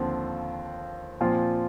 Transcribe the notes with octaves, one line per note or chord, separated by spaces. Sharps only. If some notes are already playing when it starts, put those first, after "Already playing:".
Already playing: D#2 D3 F3 C4
A#2 F3 C4 F4